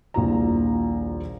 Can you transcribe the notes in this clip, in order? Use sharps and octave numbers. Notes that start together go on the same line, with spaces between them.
D#1 A#1 E4 A#5